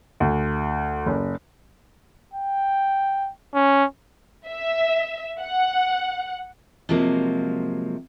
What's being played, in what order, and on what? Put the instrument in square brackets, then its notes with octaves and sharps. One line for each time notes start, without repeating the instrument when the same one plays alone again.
[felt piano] D2
F#1
[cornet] G5
C#4
[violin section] E5
F#5
[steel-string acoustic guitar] C3 F3 F#3 G#3 A#3